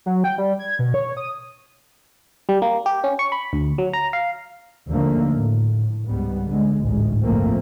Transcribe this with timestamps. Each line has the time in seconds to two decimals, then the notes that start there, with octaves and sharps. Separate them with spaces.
0.06 F#3
0.24 G5
0.38 G3
0.59 G#6
0.79 B2
0.94 C#5
1.17 D#6
2.49 G3
2.62 A#3
2.86 G4
3.04 C#4
3.19 C#6
3.32 B5
3.53 D2
3.78 F#3
3.93 A#5
4.13 F5
4.88 D#2 D3 F3 A3 A#3
5.33 A2
6.08 C#2 G#2 G3 B3
6.47 D3 G#3
6.83 A1 D2 G#2 G#3
7.21 G1 C#2 F3 A3 A#3 C4